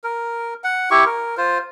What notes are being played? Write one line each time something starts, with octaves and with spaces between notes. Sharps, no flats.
A#4
F#5
E4 G4 C#6
A#4
F4 C5